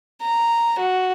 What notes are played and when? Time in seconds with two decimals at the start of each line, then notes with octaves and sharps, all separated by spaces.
0.22 A#5
0.79 F#4